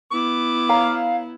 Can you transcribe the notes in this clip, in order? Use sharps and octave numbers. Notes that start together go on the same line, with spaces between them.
B3 E4 D6
C#5 F5 A#5